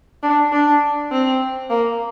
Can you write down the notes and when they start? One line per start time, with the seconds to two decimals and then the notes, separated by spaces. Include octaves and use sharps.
0.23 D4
0.52 D4
1.12 C4
1.70 A#3